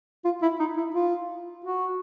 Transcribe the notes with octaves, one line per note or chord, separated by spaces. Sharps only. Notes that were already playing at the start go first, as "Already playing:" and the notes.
F4
E4
D#4
E4
F4
F#4